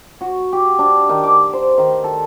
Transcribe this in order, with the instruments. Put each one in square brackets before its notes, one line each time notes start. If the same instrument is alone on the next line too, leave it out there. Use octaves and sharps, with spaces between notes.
[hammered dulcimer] F#4
G4
D4
D#3
D6
C5
D#3
A4